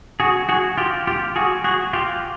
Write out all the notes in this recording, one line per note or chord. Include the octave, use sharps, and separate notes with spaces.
F#4 G#4
F#4 G#4
F4 G4
F4 G4
F#4 G#4
F#4 G#4
F4 G4